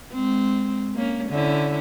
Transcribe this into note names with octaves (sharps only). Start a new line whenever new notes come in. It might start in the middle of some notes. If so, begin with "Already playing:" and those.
G#3 C4
A#3 C#4
D3 C#4 E4